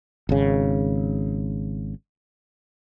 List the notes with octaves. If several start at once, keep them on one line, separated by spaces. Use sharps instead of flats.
G#1 C#3